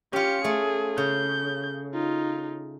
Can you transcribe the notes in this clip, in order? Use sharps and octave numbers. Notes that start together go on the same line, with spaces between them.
C#4 F4 G4 C#7
A3 G#4
C#3 G6
D#4 F4